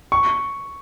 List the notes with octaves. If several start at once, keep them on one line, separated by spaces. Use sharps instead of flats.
C#6